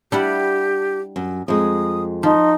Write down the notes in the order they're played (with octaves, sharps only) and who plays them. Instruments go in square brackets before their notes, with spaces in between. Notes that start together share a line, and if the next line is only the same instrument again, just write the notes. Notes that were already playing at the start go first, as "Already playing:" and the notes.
[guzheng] G3 E4 F#5 [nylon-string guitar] D4 [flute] G4
[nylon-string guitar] F#2
[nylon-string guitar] F2 G#3 [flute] D#6
[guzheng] F3 [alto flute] D#4 [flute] C6